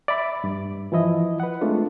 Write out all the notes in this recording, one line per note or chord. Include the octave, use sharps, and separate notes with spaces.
D5 E5 B5
G2
E3 F3 E4 D#5
B4 F#5
G#3 A3 C4 D4 F4